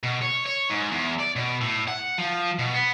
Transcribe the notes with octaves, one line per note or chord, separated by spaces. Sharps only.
B2
C#5
C#5
G#2
E2
D5
B2
A2
F#5
F3
B2
B3